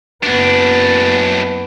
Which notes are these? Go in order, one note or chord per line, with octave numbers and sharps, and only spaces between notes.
F#1 F#2 B3 D4